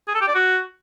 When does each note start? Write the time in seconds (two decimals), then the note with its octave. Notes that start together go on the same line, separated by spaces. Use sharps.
0.08 G#4
0.15 A4
0.21 G4
0.28 D5
0.35 F#4